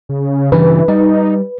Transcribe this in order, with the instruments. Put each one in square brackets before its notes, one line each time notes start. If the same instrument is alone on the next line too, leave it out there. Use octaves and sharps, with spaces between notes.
[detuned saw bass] C#3
[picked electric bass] G2 C#3 [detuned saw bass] E3 [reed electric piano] B4
[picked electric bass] G3 [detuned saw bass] D#4